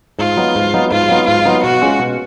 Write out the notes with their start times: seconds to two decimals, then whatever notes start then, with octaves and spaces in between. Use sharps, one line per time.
0.19 G#2 F4
0.37 F#3 B3 D#4
0.55 G#2
0.74 F#3 B3 D#4
0.91 G#2 F4
1.09 F#3 B3 D#4
1.27 G#2 F4
1.45 F#3 B3 D#4
1.63 B2 F#4
1.81 G#3 C#4 F4
1.99 B2